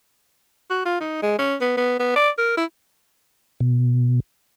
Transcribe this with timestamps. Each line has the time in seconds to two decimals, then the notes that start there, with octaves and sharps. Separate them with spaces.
0.70 F#4
0.85 F4
1.00 D#4
1.22 G#3
1.38 C#4
1.61 B3
1.77 B3
1.99 B3
2.16 D5
2.38 A#4
2.57 E4
3.60 B2